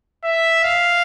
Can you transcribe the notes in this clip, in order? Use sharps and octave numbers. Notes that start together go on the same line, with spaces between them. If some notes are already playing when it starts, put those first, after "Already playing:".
E5
F5